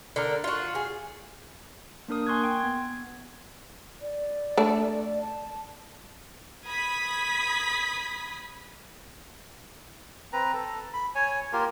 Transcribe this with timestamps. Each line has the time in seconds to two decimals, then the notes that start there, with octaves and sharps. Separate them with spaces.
0.16 D3 A#4
0.44 F4 F#4
0.75 G#4
2.08 A#3 D4 A#4 D#6
2.27 G#5 C6 C#6 F#6 G#6
2.44 G5 C6
2.60 B3 G#6
4.01 D5
4.57 A3 D4
5.21 A5
6.67 B5 D#6 G#6 B6
10.33 C4 B4 A#5
10.53 A4
10.94 B5
11.15 C#5 G#5
11.53 A#3 F4 G4 A#4